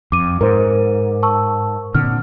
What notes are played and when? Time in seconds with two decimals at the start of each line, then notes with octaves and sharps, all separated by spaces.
0.12 F2 D6 D#7
0.41 G#2 A#4 C5
1.23 A5 C#6 E6
1.94 A#2 D3 C4 F6